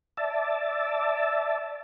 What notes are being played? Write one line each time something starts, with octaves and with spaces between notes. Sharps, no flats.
D5 E5 A5